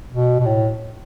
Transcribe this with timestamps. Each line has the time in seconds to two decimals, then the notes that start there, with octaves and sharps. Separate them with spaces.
0.13 B2
0.40 B2
0.46 A2